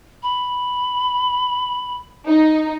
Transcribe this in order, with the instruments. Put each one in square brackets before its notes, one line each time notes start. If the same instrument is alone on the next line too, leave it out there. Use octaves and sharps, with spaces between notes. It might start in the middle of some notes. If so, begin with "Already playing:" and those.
[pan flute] B5
[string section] D#4